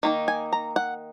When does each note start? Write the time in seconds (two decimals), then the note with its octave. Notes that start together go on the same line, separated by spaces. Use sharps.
0.03 D#3 A#3 D#4
0.28 G#5
0.53 A#5
0.76 F#5